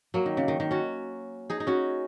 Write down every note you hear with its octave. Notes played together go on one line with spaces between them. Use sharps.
F#3 A#3
D#3
C#3
D#3
D#3
C#4 F#4
D#4 G#4
D#4
C#4 F#4